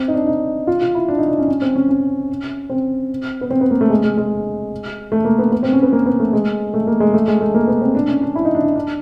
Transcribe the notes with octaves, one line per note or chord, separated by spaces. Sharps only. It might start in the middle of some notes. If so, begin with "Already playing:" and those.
Already playing: C4
D#4
D4
D#4
F4
F4
E4
D4
D#4
D4
C#4
C#4
C4
C#4
C#4
C4
B3
C4
B3
A#3
A3
G#3
G#3
G#3
A3
A#3
B3
B3
C4
C#4
B3
A#3
B3
A3
G#3
A3
A#3
G#3
A3
G#3
A3
A#3
B3
C4
D4
C#4
D4
E4
D#4
D4
D#4
D4